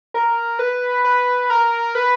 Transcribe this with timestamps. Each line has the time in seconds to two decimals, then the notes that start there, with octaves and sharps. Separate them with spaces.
0.14 A#4
0.59 B4
1.04 B4
1.50 A#4
1.95 B4